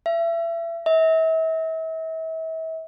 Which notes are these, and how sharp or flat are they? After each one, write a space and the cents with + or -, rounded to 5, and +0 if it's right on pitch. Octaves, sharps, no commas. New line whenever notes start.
E5 +30
E5 -40